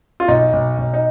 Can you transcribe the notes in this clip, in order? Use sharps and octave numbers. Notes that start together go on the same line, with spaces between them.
F4
B1 D#4
B1
B1
D#4